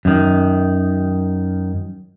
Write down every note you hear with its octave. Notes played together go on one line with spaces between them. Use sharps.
F#2 D#3